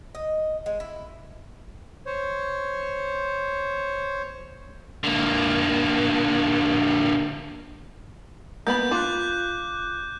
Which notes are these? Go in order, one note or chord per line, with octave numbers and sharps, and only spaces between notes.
D#5
G#3
E4
C5 C#5
D3 A#3
A#3 B3 B5 G6
F4 D6 F#6